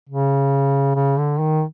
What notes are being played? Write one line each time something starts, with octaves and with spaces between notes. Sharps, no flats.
C#3
C#3
D3
D#3